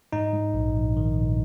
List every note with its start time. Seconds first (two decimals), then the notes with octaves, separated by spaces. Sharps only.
0.12 G#2 D#4
0.33 G#2
0.54 A#1
0.75 A#1
0.97 D#3
1.17 A#1